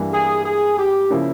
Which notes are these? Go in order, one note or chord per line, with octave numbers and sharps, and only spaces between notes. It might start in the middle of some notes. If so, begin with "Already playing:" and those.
Already playing: G2 E3 G3 A#3
G#4
G#4
G4
C#3 F3 A#3 C#4 E4